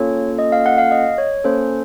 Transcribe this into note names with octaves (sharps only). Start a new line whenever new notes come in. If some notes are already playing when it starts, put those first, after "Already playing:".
Already playing: A#3 C#4 F4 A4 C#5
D#5
F5
F#5
F5
D#5
C#5
A#3 C#4 A4 C5